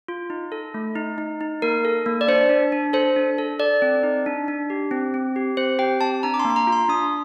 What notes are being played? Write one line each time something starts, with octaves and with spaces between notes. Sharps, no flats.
F4
D#4
A4
A3
D#4
D#4
D#4
A#3 A#4
A4
A#3
D5
D4 C5
D4
D4
A4 C5
D4
A4
A4 D5
C4
D#4
D4
D4
G4
C4
C4
G4
C4 C5
G4 G5
C4 A5
D4 A#5
D6
C6
A#3
C6
A#5
F4
C6
D4 D#6